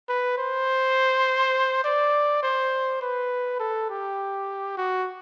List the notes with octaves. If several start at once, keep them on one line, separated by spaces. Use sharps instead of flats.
B4
C5
D5
C5
B4
A4
G4
F#4